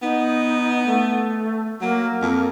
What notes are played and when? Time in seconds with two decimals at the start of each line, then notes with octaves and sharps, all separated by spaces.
0.02 B3 D#4
0.86 A3
1.81 F#3 A#3
2.21 F2